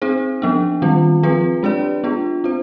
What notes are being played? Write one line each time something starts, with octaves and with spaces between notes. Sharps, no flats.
C4 D#4 G#4 C5
F3 B3 D4
D#3 G3 C4 F4
F3 C4 F4 G#4 B4
G#3 D4 G4 B4 D5
B3 D4 F4 G#4
C4 F4 C5